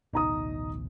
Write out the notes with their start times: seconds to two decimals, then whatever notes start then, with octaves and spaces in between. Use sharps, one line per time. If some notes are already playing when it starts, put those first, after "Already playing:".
0.13 A1 D2 B2 D#4 A#5 D#6